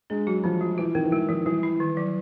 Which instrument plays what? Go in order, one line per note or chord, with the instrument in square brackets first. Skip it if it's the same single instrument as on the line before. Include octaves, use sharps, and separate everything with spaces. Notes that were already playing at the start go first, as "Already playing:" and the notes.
[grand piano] G#3 [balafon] D4
[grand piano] F#3 [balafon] F#4
[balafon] E3 [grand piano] F3
[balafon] G3
[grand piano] E3 [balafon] F4
[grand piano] D#3 [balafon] C4
[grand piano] E3
[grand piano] D#3 [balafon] G#3
[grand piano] D#3 [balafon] F3
[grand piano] E3 [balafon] G3
[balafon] E4
D#3
F#3